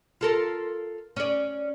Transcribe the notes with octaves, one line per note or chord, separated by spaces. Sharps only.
F4 A4 A#4
C#4 D5